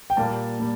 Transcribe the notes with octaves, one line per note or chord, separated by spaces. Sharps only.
G5
A#2 G3 A#3 A5
A#2 G3